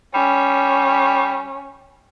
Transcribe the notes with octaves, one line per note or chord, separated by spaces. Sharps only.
G3 C#4